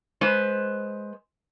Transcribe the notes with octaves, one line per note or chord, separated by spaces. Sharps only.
G#3 B4 C5